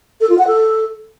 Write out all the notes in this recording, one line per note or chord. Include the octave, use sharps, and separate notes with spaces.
A4
F4
F#5
A4